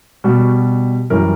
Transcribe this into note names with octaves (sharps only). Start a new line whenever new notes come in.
B2 G3 F#4
F#2 E3 G3 A#4